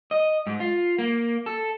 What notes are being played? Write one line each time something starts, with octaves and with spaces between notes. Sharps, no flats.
D#5
G#2
F4
A#3
A4